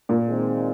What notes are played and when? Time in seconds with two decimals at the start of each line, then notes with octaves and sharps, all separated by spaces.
0.09 A#2
0.27 D#3 G#3 C4